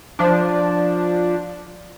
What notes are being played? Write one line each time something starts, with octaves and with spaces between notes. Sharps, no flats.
F3 D4